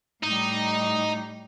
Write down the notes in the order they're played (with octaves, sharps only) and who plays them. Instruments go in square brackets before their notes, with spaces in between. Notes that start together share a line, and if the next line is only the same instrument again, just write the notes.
[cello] A2 G3 [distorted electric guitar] D#4